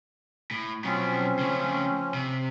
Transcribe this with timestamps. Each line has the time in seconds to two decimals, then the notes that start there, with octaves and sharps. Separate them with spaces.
0.51 A2
0.84 B2 F3 F#3 C4 C#4
1.39 C#3 A3
2.14 C3